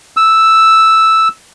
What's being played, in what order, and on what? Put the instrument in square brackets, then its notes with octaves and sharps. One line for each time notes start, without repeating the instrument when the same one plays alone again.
[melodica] E6